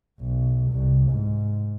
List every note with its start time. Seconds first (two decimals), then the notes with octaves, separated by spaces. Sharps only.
0.21 B1
0.71 C2
1.10 G#2